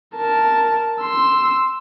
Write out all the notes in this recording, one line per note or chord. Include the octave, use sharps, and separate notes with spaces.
A#4 A5
C6 E6